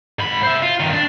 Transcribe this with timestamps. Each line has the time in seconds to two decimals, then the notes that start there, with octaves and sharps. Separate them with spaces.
0.19 G#2 B5
0.43 C5 E5
0.62 F4
0.80 G2 D#3
0.93 D4